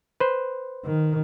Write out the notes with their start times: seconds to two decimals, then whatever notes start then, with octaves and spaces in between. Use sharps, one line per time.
0.20 B4 C5
0.85 D#3